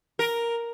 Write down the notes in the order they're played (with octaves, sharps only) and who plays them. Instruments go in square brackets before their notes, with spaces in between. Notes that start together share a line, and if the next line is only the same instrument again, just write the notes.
[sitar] A#4